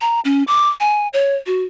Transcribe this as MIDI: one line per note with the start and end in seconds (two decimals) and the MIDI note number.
0.01 0.20 82
0.25 0.44 61
0.48 0.69 86
0.80 1.08 80
1.13 1.36 73
1.46 1.62 66